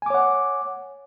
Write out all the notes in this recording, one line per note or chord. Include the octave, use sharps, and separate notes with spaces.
C#5 F#5 G#5 D6